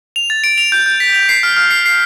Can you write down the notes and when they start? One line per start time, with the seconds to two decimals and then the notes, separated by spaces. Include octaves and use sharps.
0.16 F7
0.30 A6
0.44 D7
0.58 F7
0.72 G6
0.86 G6
1.00 B6
1.14 F7
1.29 C7
1.43 F6
1.57 F6
1.71 C7
1.86 C7